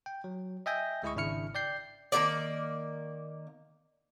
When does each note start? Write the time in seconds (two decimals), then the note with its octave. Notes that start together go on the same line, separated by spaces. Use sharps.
0.06 G5
0.24 F#3
0.66 D#5 E5 G5 G#5 G6 A#6
1.03 D2 G#3 E4 G#4 D#5 C#6
1.15 G#1 C#3 D4 E4 F6 C#7
1.55 D5 G5 G6 C7
2.12 D#3 E3 A#3 D5